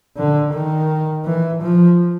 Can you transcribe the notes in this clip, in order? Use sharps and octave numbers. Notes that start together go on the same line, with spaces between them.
D3
D#3
E3
F3